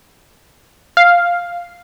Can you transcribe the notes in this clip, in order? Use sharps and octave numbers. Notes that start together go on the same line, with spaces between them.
F5